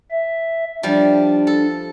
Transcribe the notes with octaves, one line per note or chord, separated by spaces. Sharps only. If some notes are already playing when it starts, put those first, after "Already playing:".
E5
F3 G3 D4
A4